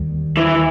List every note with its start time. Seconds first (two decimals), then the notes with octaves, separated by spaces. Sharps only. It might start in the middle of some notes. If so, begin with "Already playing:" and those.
Already playing: D#2 D#3 G3
0.37 E3